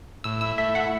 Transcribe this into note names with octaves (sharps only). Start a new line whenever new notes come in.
A2 E6
E4 E6
A3 E5
E4 F#5